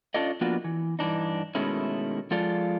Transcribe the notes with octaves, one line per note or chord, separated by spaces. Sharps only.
C#4 D4 F4 A4 D5 D#5
F3 A#3 B3 D4 F4 F#4
E3
G2 E3 D4 D#4
B2 D#3 G#3 A3 C#4 E4
F3 G#3 F4 A4 D5